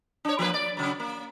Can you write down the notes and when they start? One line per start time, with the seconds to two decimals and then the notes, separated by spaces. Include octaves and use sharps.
0.25 D4 C#5
0.39 F3 A#3 B4
0.54 D5
0.77 C#3 F#3
1.00 A#3